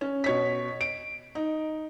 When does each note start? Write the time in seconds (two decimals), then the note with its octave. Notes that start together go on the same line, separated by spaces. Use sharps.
0.01 C#4
0.24 B2 C#5 B6
0.81 D7
1.35 D#4